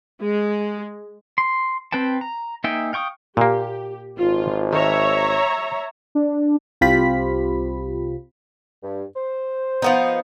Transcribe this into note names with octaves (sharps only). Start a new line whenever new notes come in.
G#3
C6
C4 B4 G5 A5
A#5
A#3 D#4 E5 G5 G#5
F5 G5 C#6 D#6
A#2 A#3 G4
G#1 F4
D#3 C#5 E5 A#5
D4
C2 C4 F4 G4 B5 B6
G2
C5
F3 B3 D#4